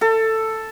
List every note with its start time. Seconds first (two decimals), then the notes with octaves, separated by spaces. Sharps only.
0.01 A4